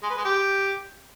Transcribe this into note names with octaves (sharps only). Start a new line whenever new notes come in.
G#3
B4
G#3
G4